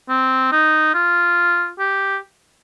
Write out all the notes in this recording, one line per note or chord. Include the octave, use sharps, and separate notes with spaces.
C4
D#4
F4
G4